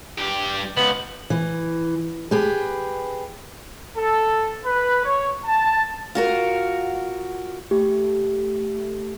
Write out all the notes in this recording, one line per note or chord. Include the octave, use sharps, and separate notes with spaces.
G2 G4
C#2 B3 F#7
E3
G4 G#4 B4
A4
B4
C#5
A5
F4 F#4 A#4
A3 G4